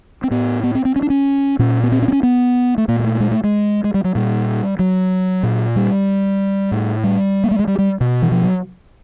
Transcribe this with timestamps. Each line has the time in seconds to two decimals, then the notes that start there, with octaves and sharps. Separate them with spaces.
0.24 C4
0.31 A2 B3
0.63 B3
0.75 C4
0.85 C4
0.96 C#4
1.02 D4
1.10 C#4
1.59 A#2 C#4
1.83 B3
1.92 C4
2.02 C#4
2.08 C4
2.12 C#4
2.23 B3
2.78 A3
2.88 A#2 A#3
3.00 A#3
3.04 A3
3.20 G#3
3.31 A3
3.44 G#3
3.84 G#3
3.94 G3
4.04 F#3
4.15 A#2 G3
4.79 F#3
5.43 A#2
5.76 G3
6.72 A2
7.04 G3
7.44 A#3
7.51 A3
7.59 G#3
7.67 G3
7.78 G3
8.01 B2
8.22 E3
8.32 F3
8.43 F#3